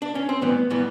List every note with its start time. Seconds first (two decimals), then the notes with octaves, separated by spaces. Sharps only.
0.02 D4
0.15 C#4
0.29 C4
0.41 A2 E3 G3 B3
0.70 A2 E3 G3 B3